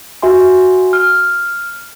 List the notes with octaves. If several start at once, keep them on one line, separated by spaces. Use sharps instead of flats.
F#4 E5 G#5 C6
F6